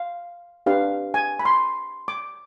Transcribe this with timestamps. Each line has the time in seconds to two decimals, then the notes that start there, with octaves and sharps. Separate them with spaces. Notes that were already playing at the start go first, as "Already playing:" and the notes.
Already playing: F5
0.66 D4 G4 B4 F5
1.14 G#5
1.39 B5
1.45 C6
2.08 D6